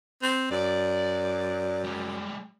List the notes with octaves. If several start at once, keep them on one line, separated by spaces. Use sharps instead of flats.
C4
F#2 D5
G3 G#3